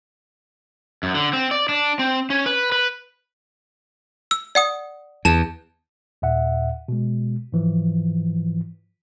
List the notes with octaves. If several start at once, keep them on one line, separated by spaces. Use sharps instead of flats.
F#2
D3
C4
D5
D4
C4
C#4
B4
B4
E6
D5 F#5 D#6
E2 A5 E7
D#2 A#2 E5 F#5
B2 G#3
G#2 E3 F3